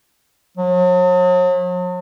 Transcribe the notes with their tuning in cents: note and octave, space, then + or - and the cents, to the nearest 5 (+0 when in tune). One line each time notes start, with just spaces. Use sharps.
F#3 -45